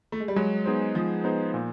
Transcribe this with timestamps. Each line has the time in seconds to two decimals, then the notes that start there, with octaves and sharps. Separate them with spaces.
0.12 A3
0.20 G#3
0.28 G3
0.36 F#3 G#3
0.66 B3 D#4 G#4 C5
0.95 F3 G#3
1.24 B3 D#4 G#4 C5
1.54 A#2